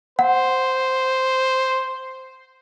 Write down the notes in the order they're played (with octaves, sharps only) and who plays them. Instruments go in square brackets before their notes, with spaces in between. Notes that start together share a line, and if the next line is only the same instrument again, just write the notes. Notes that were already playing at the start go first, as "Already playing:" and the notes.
[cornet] C5 [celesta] F#5